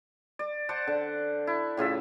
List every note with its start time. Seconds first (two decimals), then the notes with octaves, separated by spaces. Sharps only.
0.39 D5
0.69 C5 D5 F#5 A5
0.87 D3
1.47 E4
1.77 A2 C#3 F4 E5